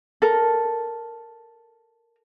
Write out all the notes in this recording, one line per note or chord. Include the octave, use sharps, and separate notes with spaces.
A4 A#4